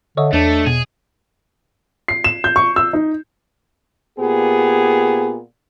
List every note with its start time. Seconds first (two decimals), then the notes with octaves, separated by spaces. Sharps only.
0.17 D3 C#5 D#5 E5
0.33 E2 A3 D4
0.67 B2 G#4
2.08 C7
2.24 E7
2.44 G6
2.56 C#6
2.76 E6
2.93 D#4
4.19 A#2 B3 G4 G#4